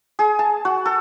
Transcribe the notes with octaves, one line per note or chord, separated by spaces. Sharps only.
G#4
A5
F#4
A4